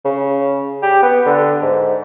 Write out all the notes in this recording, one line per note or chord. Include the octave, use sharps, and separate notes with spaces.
C#3
G4
B3
D3
G#2